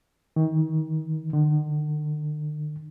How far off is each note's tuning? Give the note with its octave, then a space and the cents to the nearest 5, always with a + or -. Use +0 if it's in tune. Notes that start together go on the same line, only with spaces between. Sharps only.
D#3 +35
D3 +45